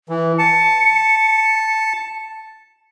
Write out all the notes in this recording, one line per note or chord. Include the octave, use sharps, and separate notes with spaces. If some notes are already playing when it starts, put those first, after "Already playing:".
E3
A5 C#7